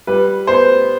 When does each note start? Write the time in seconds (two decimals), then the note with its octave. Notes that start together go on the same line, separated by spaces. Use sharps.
0.07 G3 B4
0.47 B3 C5